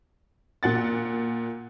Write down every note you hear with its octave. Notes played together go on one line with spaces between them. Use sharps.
A#2 F#5 A6